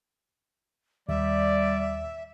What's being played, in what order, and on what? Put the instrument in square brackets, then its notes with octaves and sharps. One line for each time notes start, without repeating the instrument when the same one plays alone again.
[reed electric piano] D#2 [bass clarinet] G3 [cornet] D5 [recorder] E5